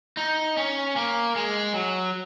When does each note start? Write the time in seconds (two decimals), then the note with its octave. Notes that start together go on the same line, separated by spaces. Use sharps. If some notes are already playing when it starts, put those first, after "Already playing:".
0.17 D#4
0.57 C#4
0.96 A#3
1.36 G#3
1.74 F#3